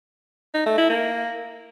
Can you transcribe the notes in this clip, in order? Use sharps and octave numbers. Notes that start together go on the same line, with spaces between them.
D#4
A3
E4
A#3